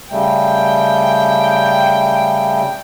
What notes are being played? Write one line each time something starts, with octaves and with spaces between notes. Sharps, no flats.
C#3 G3 A3 G5